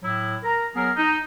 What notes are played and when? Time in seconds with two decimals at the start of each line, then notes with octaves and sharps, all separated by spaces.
0.03 A2 F#3 E4
0.43 A#4 A#5
0.74 F#3 B3 G#4 A#4
0.96 D#4